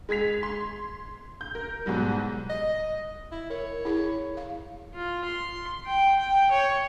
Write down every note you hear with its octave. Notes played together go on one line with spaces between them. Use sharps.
G#3 G#4 G#6 B6 F7
C6
G6
A#4
G#2 B2 F#3 G3
D#5
E4
A#4 C#5
E4 G#4
F5
F4
C6
G5
G5
C#5